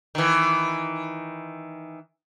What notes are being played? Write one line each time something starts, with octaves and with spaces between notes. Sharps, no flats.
D#3 E3